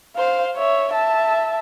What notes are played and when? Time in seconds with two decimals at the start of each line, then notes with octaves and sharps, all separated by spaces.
0.16 C5 F5
0.56 C#5 E5
0.92 E5 A5